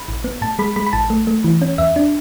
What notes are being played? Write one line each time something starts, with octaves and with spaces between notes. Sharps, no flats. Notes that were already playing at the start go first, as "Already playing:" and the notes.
Already playing: B5
A1
B3
A2 A5
G#3 B5
G#3 B5
B5
A1 A5
A3
A3
E3
C#4
E2 E5
D4